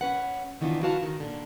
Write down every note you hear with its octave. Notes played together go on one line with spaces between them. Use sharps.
C#4 B4 F#5
D#3 E3 B3 D4 D#4 F4
E4 F#4 B4 F5 A5
D#3
A#2 D3